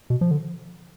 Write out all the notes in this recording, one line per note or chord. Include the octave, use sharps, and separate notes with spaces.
B2
F3
D3